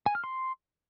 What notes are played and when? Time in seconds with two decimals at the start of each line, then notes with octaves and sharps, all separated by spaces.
0.06 G#5
0.15 F6
0.24 C6